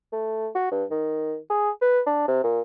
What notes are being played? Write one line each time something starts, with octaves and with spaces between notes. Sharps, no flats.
A3
F#4
G2
D#3
G#4
B4
D4
C3
A#2